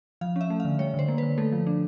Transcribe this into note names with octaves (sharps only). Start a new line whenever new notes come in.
F3 F5
C#4 E5
A3
F5
D3
G3 C#5
D3 C5
A#3
D3 B4
A3 A4
F3
D4